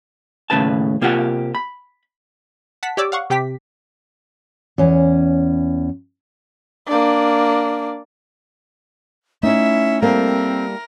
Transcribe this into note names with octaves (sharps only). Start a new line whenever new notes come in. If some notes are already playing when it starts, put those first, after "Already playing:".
D#2 A2 C#3 B4 A5
C3 A#3 F4 G4 B4 F#5
B5
F#5 A5 B6
G4 C#5 D5 D6 E6
F5 F#5 C#6
C3 G4 G5 B6
E2 C#4
A#3 D4
A3 C#4 D#4 E4 E5
G3 A#3 C4 A4 A#4